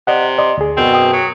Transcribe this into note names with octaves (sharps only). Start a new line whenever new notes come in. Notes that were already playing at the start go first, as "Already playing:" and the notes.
C3 D5 D#5 F#5
D5 D#5 C6
D2 G#4
F#2 B2 C4
G5 D#6
F#3